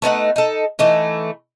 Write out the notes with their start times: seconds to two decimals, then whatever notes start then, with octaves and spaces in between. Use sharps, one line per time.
0.02 A3 B3 D#4 F#5
0.36 D#4 A4
0.79 E3 A3 D#4